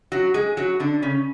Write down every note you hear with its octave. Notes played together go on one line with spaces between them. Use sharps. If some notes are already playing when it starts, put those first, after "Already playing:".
F#3 F#4
G#3 G#4
F#3 F#4
D3 D4
C#3 C#4